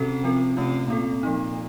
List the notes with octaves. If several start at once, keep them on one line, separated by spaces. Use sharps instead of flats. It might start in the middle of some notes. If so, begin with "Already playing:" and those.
Already playing: C3 C#4 F#4 A4
F3 C4 F4 A#4
C3 A3 C#4 F4
A#2 C4 F4 A4
F3 A#3 D#4